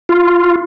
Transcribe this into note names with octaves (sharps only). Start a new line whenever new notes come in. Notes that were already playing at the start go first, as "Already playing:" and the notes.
F4